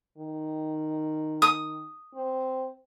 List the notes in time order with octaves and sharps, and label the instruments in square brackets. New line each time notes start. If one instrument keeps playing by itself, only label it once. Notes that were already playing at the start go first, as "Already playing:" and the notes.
[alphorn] D#3
[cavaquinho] D#6
[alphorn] C4